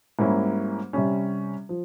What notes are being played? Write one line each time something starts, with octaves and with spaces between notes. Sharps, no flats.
G#2 G3 A#3 C#4 E4
C3 G3 C#4
F3